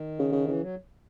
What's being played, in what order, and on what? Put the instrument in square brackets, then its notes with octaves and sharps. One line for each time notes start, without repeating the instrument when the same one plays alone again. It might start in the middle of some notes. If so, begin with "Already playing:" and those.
Already playing: [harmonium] D#3
[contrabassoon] C#3
C#3
[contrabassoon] C#3 [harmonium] E3
[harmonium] F#3